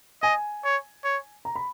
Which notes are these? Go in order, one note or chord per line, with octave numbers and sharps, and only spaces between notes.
D#5 G#5
C#5
C#5
A#5
B5